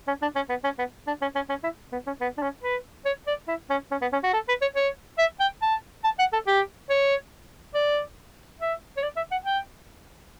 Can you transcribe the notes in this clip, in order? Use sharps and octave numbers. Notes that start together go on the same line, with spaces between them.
C#4
D4
C#4
B3
C#4
B3
D4
C#4
C#4
C#4
E4
B3
C#4
B3
D4
C#4
B4
C#5
D5
E4
C#4
C#4
B3
C#4
F#4
A4
B4
C#5
C#5
E5
G5
A5
A5
F#5
A4
G4
C#5
D5
E5
C#5
D5
E5
F#5
G5